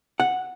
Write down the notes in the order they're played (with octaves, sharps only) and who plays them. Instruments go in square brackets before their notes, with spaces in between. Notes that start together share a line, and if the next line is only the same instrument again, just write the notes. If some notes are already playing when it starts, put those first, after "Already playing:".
[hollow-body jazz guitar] F#5